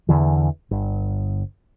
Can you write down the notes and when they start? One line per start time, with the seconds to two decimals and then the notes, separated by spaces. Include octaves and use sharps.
0.09 E2 D3 E3
0.71 G1